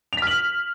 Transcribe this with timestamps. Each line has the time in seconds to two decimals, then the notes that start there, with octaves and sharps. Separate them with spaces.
0.13 F7
0.17 B6
0.22 F6
0.27 F#7